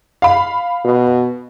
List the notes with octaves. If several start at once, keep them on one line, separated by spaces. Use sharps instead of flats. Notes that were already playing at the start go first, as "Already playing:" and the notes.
F5 B5
B2